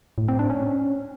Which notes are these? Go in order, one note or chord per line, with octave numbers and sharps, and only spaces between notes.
A2
C4
D4
C#4